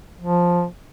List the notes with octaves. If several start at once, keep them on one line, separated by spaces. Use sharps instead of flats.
F3